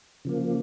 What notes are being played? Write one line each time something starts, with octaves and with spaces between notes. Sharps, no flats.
C#3 F3 A#3